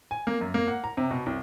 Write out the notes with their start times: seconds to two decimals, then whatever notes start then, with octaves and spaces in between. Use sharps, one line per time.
0.11 G#5
0.27 A#3
0.41 F#2
0.54 A#3
0.68 F#5
0.84 A#5
0.97 C3
1.11 B2
1.26 C2